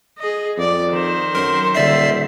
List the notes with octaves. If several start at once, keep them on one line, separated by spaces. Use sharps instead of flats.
G#4 D#5
F2 D5
D#3 C5
F#2 A#4 C6
D#1 D3 D5 E5 C7